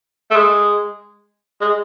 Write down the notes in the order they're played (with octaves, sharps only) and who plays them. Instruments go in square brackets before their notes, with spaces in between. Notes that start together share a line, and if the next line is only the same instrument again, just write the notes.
[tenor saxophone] A3
G#3
G#3